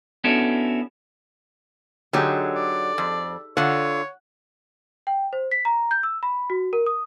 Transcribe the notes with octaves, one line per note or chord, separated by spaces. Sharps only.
B3 C#4 D4 E4 F#4 A4
D3 F#3 D#4 G4 G#4
D5
F2
D3 F4 C#5 F#5
G5
C5
B6
A#5
G6
E6
B5
F#4
A#4
D#6